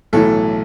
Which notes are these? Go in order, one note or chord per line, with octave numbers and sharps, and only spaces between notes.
B1 A2 E3 A4